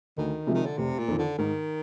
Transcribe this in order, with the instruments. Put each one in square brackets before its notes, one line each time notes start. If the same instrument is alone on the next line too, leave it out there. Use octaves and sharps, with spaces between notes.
[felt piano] D2 [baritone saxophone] D#3
[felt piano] C3 F3 G#3
[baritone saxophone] D#3
D3
[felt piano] F1 [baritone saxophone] C3
[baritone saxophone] A#2
[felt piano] F2 D#3
[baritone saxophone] D3
[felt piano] G#2 [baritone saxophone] D#3